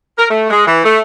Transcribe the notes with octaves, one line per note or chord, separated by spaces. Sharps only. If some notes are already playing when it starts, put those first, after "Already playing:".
A#4
A3
G#3
E3
A3